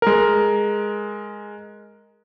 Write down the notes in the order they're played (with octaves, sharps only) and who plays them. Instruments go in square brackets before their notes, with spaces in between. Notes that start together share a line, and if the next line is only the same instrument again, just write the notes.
[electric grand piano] G#3 A#4